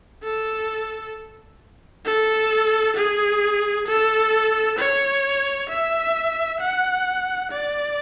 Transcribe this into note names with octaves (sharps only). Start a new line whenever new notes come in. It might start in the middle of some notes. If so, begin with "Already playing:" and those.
A4
A4
G#4
A4
C#5
E5
F#5
D5